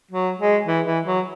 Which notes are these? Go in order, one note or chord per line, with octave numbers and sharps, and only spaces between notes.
F#3
G#3
E3
E3
F#3